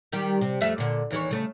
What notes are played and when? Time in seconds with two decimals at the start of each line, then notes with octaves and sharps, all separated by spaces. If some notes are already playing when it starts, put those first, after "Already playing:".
0.12 D#3 G3 G4
0.41 C3
0.61 F2 A3 E5
0.78 A#2 D3
1.11 D#2 E3 C#5
1.31 C#3 A3